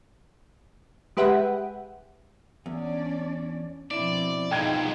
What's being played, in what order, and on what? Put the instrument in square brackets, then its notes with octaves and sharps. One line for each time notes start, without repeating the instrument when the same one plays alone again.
[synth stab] G#3 G4 B4 E5 F#5
[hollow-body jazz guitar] E2 [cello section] C#4 D4 D5
[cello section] B2 F3 C4 [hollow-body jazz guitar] D4 E4 [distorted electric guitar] D5
[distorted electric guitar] C2 B2 [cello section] D#4 F4 G#4 [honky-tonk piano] G5 G#6